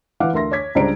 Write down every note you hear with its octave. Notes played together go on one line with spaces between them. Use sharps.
E3 B4 F5 F#5 D6
D2 A#4 E5 C6 A#6
C#5 D6 G#6 B6
C#2 G3 D4 C5 A#5 D7